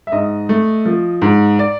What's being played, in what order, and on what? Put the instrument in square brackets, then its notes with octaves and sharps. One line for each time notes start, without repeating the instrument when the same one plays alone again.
[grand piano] E5
G#2 D#5
A3
F3
G#2
D5